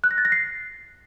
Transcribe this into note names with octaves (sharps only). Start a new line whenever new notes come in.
F#6
A#6
A6
A#6
C7